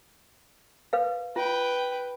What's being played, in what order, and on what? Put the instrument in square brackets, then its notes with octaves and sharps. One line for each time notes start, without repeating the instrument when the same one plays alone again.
[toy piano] B4 F5
[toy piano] F4 [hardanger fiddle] B4 G5